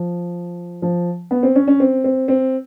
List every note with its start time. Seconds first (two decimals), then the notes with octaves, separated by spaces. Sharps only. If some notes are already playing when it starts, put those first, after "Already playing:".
Already playing: F3
0.82 F3
1.31 B3
1.43 C4
1.56 C#4
1.68 C#4
1.80 C4
2.04 C4
2.28 C4